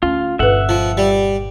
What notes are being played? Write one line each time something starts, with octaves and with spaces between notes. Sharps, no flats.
D2 C#4 F4
G1 A#2 A4 B4 E5 F#5
F3
G3